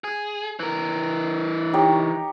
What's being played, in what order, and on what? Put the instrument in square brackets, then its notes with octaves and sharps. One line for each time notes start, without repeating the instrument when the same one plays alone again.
[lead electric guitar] G#4
E3 A#4
[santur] D#4 G4 C#5